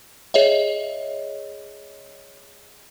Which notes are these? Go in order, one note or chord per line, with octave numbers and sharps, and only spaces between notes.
G#4 C#5 D#5 E5